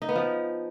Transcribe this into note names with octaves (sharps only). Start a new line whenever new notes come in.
D#4
B3
F3